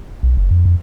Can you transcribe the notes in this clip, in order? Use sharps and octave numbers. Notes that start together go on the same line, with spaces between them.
B1
F#1
F2
F2